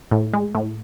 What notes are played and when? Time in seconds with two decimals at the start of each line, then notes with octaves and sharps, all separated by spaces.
0.11 A2
0.33 G#3
0.55 A2